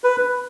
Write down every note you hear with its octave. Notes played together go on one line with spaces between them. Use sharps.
B4